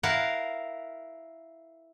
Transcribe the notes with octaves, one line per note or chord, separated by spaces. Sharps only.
E4 A#4 F5 F#5